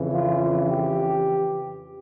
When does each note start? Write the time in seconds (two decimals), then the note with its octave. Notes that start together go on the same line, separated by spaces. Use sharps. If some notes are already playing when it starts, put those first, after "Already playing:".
Already playing: F2 C#3 E3
0.14 F4
0.69 G4